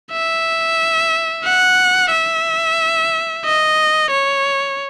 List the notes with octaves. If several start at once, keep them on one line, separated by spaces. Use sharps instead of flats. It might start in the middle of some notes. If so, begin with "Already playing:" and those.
E5
F#5
E5
D#5
C#5